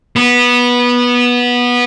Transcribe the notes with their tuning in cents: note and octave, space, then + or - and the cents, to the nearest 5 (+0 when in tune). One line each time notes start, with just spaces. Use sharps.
B3 -15